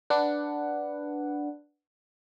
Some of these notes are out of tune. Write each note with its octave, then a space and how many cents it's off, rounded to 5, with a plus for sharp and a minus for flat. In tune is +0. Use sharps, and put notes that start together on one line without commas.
D4 +0 B4 +0 F#5 +0